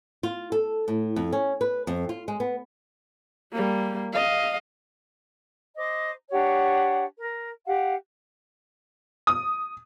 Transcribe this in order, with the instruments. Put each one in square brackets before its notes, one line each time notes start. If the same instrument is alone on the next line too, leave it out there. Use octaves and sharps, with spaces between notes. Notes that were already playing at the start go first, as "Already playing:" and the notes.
[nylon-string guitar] F4
A4
A2
F2
C#4
B4
F2
F4
G#3
B3
[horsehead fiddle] G3 A#3
D#5 F5
[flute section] C5 D#5 D6
D4 G4 C#5 F#5
A#4
G4 F5 F#5
[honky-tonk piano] D#6